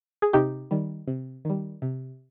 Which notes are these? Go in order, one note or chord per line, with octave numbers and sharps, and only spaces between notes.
G#4
C3 D#4 G4
D#3 G3
C3
D#3 G3
C3